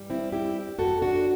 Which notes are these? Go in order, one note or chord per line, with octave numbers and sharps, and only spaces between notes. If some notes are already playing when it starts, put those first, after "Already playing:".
Already playing: G2 E3 G3
C4 E4
E4 G4
F#2 F#3 F#4 A4
D4 F#4